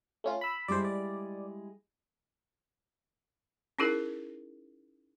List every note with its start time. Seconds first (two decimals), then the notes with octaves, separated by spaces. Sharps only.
0.24 A3 C#4 F4
0.41 B5 E6
0.68 G3 G#3 E4 C5 D5
0.85 D5
3.79 C#4 D#4 E4 G#4 A#4